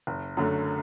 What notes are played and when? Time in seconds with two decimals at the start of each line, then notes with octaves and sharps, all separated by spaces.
0.07 F#1
0.37 F#2 D3 A3